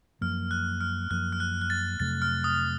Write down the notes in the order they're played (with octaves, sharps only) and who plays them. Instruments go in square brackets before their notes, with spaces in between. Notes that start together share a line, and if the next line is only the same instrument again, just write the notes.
[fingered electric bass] F#2 F3 A#3 [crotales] F6
[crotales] F#6
F6
[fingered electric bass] F#2 F3 A#3 [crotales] F#6
[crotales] F6
F#6
F#6
A6
[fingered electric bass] F2 C3 F#3 A3 [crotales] A6
[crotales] F6
D#6